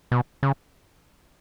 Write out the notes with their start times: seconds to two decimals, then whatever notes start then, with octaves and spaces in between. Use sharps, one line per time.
0.11 B2
0.43 C#3